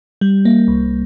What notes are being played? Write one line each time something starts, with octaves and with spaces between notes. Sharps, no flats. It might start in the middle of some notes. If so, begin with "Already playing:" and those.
G3
A#3
C2